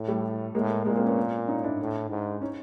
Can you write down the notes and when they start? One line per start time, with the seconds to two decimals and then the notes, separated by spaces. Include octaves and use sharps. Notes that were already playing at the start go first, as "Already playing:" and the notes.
Already playing: A2
0.08 G3 A3
0.55 A2 G#3 A#3
0.85 A#2 G#3 A#3
0.96 A#3 C4
1.06 B3 C#4
1.47 C#4 D#4
1.63 D4 E4
1.80 A2
2.10 G#2
2.41 C#4 D#4